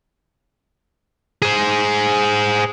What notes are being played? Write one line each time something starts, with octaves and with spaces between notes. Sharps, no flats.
G#4 C5